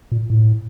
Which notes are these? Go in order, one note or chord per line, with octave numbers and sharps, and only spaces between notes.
A#2
A2